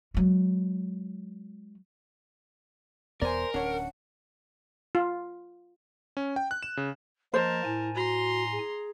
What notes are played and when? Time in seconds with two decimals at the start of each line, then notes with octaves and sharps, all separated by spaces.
0.14 F#3 G#3
3.22 E1 E2 B3 A#4 C5 D5 G#5
3.54 D1 C#4 D4 C#5 F#5
4.95 F4
6.17 C#4
6.36 G5
6.51 F#6
6.63 E7
6.77 C#3
7.34 F3 A#3 A#4 C5 D#5 A5
7.64 A2 E4 G#5
7.95 F#4 A#5 C6
8.51 G#4